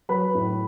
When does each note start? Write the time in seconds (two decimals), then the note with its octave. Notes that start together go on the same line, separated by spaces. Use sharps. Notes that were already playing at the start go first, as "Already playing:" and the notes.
0.09 F#3 B4 B5
0.35 A2